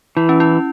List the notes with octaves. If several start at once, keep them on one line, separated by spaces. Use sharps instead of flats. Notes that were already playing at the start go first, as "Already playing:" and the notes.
E3 E4
C#4
E4